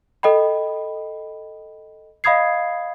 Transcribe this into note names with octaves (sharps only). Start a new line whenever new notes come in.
A4 D#5 G5 B5
D#5 F5 B5 D#6 G#6 C7